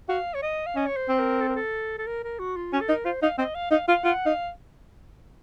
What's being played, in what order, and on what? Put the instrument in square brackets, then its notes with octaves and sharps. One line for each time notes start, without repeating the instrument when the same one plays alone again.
[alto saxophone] F#4 [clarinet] F5
[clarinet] C#5
D#5
F5
[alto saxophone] C#4 [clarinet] D#5
[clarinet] C#5
C5
[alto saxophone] C4
[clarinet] A#4
A4
A#4
A4
A4
A#4
A#4
F#4
F4
[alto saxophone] C#4 [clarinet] F#4
[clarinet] A4
[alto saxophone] D#4 [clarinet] A#4
[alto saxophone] F4 [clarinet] C5
[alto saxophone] D#4 [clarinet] F5
[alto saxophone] C4 [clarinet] D#5
[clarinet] F5
[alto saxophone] D#4 [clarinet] F5
[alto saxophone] F4 [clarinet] F5
[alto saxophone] F4 [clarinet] F#5
[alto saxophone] D#4 [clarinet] F5